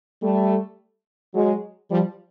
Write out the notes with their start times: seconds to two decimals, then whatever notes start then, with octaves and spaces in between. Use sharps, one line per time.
0.21 G3 A3
1.35 F#3 G#3
1.91 F3 G3